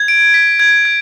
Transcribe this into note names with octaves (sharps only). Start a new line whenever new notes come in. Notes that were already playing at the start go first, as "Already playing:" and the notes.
Already playing: G#6
D7
B6
G#6
G#6